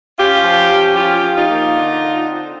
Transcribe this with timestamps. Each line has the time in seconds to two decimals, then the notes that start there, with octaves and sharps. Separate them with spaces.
0.19 C#4 F4 G4
0.44 F3
0.71 C#4
0.96 F3 F4 G4
1.23 F3
1.36 D#4 F4
1.49 A#3
1.74 D3
2.01 D3
2.27 C4